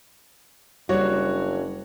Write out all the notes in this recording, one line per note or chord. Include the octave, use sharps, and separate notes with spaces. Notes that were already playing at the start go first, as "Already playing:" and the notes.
F#1 G3 D4 F#4 C#5